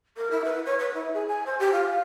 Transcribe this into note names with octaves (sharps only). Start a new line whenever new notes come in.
A#4
E4
B4
C#5
B4
E4
G#4
G#5
C5
G4
F4
F5